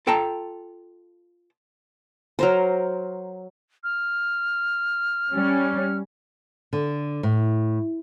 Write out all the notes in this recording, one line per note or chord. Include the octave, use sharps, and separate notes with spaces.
F4 A4 G5 A5 A#5
F#3 A#4 C5
F6
G3 C#4
D3
A2